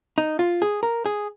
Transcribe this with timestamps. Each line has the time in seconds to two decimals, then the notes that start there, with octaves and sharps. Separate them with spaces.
0.18 D#4
0.39 F4
0.62 G#4
0.83 A#4
1.06 G#4